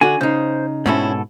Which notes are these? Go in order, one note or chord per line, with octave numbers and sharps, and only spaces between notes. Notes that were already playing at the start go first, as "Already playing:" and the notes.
D3 F#4 G#5
C#3 D#4 C5
G#2 B2 C4 C#4 E4 A4